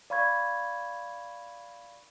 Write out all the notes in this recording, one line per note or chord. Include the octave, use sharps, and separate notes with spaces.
D5 F5 B5 C#6 G#6